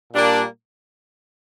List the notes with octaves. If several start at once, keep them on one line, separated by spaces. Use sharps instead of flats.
A#2 G3 A#3 D4